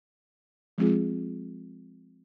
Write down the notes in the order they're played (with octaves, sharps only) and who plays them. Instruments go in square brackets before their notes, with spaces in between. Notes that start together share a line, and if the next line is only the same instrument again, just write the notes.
[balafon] F3 G#3 C4 F4 G#4